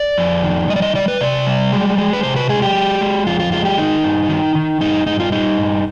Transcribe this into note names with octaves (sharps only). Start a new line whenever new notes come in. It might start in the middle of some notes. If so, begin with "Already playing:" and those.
Already playing: D5
F2
D#3
G3 D#5
D5
D#5
G3 D5
B4
C3 D5
G3
G#3
G#3
B4
C3 C5
B4
G#3 G#4
G4
G#3
G#3
F2 F4
F4
G#3 F4
G4
D#3 D#4
G2
D#3
D#3
G2 D#4
G2 D#4
F4
G3 D#4
G2